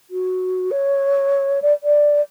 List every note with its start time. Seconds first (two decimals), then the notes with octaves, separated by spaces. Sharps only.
0.10 F#4
0.71 C#5
1.62 D5
1.83 D5